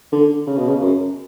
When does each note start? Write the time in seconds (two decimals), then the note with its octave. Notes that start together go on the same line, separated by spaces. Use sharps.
0.13 D3
0.47 C#3
0.57 B2
0.69 C#3
0.82 F#2